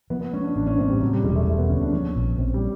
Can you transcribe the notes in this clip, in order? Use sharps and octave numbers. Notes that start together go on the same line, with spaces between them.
F3 B3
B3
G#3 C#4
D4
A1 D4
C#4
A2 C4
G3
C3 F#3
G3
E1 G#3
A3
E1 A3
B3
D2 C#4
D4
F3 C#4
A#1
A#1 C4
G3